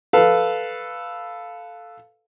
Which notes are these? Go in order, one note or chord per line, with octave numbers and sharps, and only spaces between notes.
A4 B4 F5